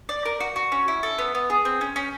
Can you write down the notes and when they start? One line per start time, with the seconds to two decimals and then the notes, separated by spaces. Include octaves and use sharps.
0.09 D5
0.25 A#4
0.40 F#4
0.56 F#4
0.72 C#4
0.88 E4
1.03 A4
1.18 B3
1.35 B3
1.50 G#4
1.65 C4
1.81 C#4
1.96 C#4